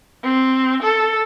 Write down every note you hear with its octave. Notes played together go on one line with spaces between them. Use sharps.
C4
A4